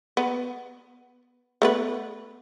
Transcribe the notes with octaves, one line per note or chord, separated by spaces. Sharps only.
B3
A3 B3 B4